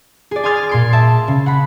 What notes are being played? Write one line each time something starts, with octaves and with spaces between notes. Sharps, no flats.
G#4 D5
G#5 C6 D#6 F6 G#6 A6
A#2 C6 D7
E5 A5
C#3
F#5 B5